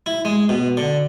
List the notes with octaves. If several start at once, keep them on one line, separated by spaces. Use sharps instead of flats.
E4
G#3
B2
D3